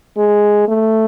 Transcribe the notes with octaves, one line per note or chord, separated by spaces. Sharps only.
G#3
A3